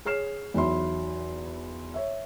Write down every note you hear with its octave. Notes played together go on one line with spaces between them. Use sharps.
G#4 C#5 F6 C7 E7
E2 F#3 D#4 E5 B5 C6
C#5 E5